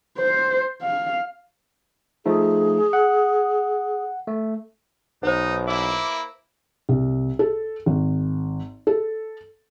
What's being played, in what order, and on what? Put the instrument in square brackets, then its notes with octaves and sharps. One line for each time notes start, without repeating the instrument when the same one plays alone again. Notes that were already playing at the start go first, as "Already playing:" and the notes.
[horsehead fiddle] C5
F5
[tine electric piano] F3 A3 D#4 [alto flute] G#4
[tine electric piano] F#5
A3
[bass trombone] B1 [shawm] D#4 [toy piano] B4 C5
[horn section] A#3 E4 [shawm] D6
[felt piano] C2
A4
G#1
A4